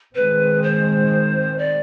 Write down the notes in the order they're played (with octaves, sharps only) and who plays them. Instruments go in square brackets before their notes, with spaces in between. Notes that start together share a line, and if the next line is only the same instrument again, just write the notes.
[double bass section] D#3 G#3 C4 [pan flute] B4
[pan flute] C5
D5